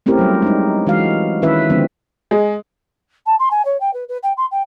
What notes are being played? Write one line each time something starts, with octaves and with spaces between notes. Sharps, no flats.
A3 C4 C#4 E4 G4 A#4
F#3 G3
G#3 D4 D#4
E3 G#3 F#4 F5
D#3 C#4 E4 B4 E5
D3 F3 G#3 B3 C4 D4
G#3
A5
C6
G#5
C#5
G5
B4
B4
G5
C6
G5